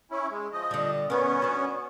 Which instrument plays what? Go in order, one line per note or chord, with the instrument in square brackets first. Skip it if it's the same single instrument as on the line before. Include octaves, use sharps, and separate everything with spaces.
[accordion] C#4 E4
G#3
F3 D#5
[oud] D3 G3
[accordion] B3 C#4 [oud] A#4 B4
[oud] D4 F#4